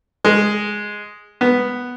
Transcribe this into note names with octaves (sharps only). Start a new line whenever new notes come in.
G#3
B3